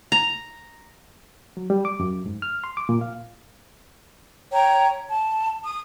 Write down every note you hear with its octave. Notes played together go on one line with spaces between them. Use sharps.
A#5
F#3
G3
D6
F#2
G#2
F6
C6
D6
A#2
F5
C#5 G5 A#5
A5
D#6